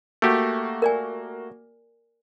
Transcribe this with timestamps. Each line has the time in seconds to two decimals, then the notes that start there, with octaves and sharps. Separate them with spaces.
0.22 A3 A#3 F#4 G4
0.82 A#4 D5 G#5